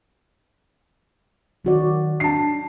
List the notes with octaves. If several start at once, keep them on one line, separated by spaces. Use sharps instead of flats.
D#3 F#3 F#4 D5
D4 A5 C7